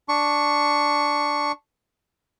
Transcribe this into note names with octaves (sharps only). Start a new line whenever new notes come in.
D4 C#6